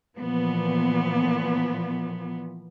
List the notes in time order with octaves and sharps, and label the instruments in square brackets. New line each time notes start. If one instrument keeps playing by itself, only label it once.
[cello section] A#2 E3 F3 B3